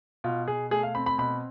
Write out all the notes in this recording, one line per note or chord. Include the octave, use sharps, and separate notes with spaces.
B2 F4
B2 G#4
A3 G#4
F5
C4 B5
B5
B2 B5